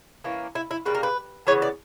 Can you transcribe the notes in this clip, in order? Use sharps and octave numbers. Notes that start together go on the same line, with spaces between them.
E3 A#3 C#4
E4
E4
C#3 G3 A#3 B4
A#4
B4
C#3 E3 B3 C#5
D5